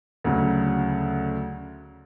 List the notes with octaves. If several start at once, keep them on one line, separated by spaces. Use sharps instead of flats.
D2 C#3 F#3